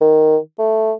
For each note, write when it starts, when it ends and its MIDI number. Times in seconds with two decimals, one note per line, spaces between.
0.01 0.37 51
0.59 0.93 57